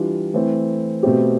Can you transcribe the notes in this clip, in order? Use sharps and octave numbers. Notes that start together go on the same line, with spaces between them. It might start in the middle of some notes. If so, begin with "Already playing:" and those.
Already playing: E3 G3 D4 F4
E3 A3 C4
B2 A3 C4 G4